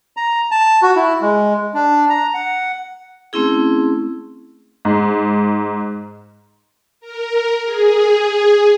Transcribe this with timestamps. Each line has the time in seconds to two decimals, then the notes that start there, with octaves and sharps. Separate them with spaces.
0.17 A#5
0.51 A5
0.82 F#4
0.96 E4
1.22 G#3
1.74 D4
2.10 A#5
2.34 F#5
3.33 A3 C4 C#4 E4 G#4
4.85 G#2
7.00 A#4
7.63 G#4